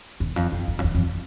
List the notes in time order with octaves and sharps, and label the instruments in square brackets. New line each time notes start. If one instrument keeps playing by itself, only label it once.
[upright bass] E2
F2
F2
E2
F2
E2
F2